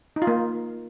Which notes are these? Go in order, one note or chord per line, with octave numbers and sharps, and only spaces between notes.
D#4
F4
A#3